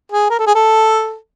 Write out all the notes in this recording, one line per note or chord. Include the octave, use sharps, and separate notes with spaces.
G#4
A#4
A4
G#4
A4